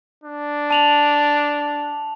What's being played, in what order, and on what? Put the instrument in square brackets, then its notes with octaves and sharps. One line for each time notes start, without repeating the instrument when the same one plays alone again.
[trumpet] D4
[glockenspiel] A5 F7 F#7